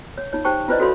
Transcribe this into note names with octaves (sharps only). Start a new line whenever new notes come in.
C#5
D#4 F4 C#5
D#4 G4 C5 G5 A5 C#6
E4 F4 B4 C5 D5 D#5
F#4 A4 C#5 F5 B5 C6